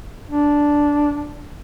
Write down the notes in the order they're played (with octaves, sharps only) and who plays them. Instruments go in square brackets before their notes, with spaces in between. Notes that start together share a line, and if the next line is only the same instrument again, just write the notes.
[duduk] D4